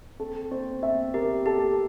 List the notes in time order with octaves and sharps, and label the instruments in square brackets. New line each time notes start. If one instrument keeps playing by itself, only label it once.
[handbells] C4 [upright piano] A4
[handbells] C4 [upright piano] C5
[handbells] C4 [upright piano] E5
[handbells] G4 [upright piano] A#4
[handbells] G4 [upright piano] A4